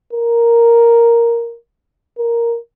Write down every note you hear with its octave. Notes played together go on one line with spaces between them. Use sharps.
A#4
A#4